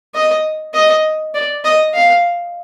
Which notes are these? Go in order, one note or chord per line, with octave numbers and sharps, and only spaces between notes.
D#5
D#5
D5
D#5
F5